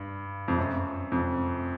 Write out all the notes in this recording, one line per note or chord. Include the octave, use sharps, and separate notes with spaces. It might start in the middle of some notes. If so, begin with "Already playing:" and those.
Already playing: G2
F2
F#2
F2